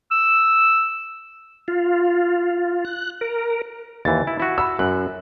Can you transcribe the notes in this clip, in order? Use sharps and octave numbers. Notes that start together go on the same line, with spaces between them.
E6
F4
F#6
A#4
D#2 E3 A6
E4
E4 F#4
B5 E6
F#2 F#6